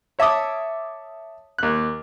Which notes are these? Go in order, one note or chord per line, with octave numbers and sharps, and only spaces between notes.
C#5 E5 A5 D6 D#6
D#2 F#6